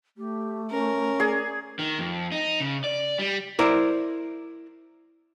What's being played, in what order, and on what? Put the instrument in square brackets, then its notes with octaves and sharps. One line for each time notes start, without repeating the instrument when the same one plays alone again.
[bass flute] A3 [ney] G4
[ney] C#4 [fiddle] A#4
[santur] G#4 D5
[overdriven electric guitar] D#3
F2
D#4
C#3
D5
G3
[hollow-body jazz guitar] E4 A#4 C5 D5